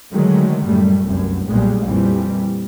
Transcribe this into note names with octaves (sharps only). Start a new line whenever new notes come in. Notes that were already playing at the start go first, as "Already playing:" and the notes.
D3 D#3 F#3 G#3 A3
F#2 A2 G3 A3
F1 C2 F#2
B1 A#2 G3 G#3
F2 A#2 E3 G3